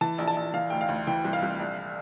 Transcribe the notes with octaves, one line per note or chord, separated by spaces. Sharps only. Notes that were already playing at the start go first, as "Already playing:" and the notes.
E3 A5
A#1
A5
A#1
E3 F5
D2 G5
F5
D2
E3 G5
C2
F5
C2
A#1